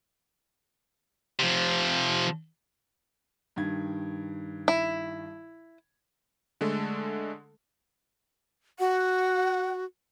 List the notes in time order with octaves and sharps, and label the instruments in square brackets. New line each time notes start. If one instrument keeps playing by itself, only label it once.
[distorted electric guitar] C3 F3
[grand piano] G2 D#3 G#6
[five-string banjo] E4
[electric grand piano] D3 G#3 A3 A4
[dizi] F#4 [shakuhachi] F#5